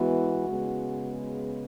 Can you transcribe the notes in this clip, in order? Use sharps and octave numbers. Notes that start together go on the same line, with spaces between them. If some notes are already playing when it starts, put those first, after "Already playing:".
Already playing: E3 G#3 B3 F#4
C#3 G#3 B3